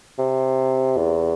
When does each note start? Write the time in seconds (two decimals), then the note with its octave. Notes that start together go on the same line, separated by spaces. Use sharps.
0.19 C3
0.97 E2